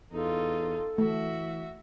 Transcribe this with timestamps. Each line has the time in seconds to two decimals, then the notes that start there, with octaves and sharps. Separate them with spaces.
0.12 E2 D#4 F4 A4
0.98 E3 A3 F#4 E5